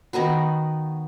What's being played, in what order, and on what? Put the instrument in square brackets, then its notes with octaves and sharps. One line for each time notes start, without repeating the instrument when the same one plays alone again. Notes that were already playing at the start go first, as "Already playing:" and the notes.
[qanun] D#3 B3 D#4 F#4